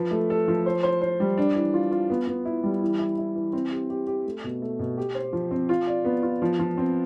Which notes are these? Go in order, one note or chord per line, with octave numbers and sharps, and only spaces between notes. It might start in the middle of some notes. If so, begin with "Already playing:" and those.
Already playing: F3 B4
A3
A4
F3
C5
C5
C5
G3
D4
E3
F4
F4
B3
B3
E4
G3
E3
E4
E4
E3
C4
G4
G4
G4
A3
B2
A3
B2
G4
C5
F3
C4
F4
D5
B3
F4
F3
F3
C4